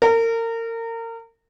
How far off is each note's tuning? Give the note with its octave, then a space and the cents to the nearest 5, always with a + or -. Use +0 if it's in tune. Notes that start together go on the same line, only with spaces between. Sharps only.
A#4 -30